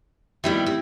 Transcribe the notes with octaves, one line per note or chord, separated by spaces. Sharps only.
D#3 G3 B3 E4
C4